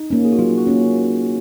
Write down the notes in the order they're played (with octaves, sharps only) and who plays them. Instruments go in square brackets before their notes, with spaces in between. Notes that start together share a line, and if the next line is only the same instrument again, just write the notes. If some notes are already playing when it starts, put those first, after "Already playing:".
Already playing: [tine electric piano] D#4
[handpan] A#3 C#4
[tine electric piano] G#4
F#4
[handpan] F#3 [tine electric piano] F4
[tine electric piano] F#4
[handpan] A#3 C#4